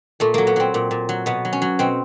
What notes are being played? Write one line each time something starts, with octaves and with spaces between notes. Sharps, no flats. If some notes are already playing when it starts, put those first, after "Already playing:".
A#2 A3
F#3 A#3
B3
F#3 C4
A#2
A#2
F#3
B2 B3
F#3
C#4
F#3
B2 C4